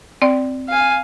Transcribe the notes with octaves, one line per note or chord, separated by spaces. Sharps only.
C4 D5 G5
F5 G#5